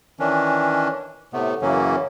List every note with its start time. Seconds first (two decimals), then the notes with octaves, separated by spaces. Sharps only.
0.20 D#3 E3 C#4 D4
1.33 A2 C3 A3 B3
1.62 F#2 C#3 E3 F#3 A#3 C#4